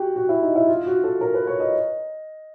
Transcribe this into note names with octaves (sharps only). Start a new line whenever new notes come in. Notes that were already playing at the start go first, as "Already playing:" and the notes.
Already playing: F#4 G4
F#4
E4
D#4
E4
F4
F#4
A4
A#4
B4
C#5
D#5